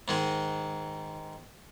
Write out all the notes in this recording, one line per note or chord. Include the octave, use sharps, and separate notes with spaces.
G#2 D#3 G#3